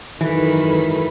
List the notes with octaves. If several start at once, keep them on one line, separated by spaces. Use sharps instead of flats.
G#1 F#2 D#3 E3 F#4 A4 B4 B5